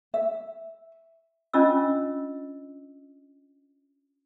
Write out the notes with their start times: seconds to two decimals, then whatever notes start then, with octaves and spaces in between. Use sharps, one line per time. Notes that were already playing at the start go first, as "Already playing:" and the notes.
0.14 E5
1.54 C#4 D4 F4 D#5 E6